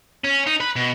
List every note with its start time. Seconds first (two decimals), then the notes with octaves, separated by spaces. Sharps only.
0.24 C#4
0.47 D#4
0.61 B4
0.76 B2